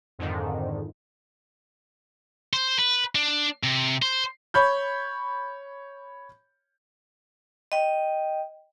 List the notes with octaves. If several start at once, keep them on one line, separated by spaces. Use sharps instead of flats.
F2 G#2 D3 D#3
C5
B4
D4
C3
C5
C#5 B5 G6
D#5 G5